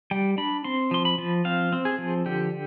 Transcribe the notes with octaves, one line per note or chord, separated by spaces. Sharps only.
G3 G5
D4 B5
C4 C6
F3 C6
B5
F3
C4 F5
C4
G#4
F3
D3 G4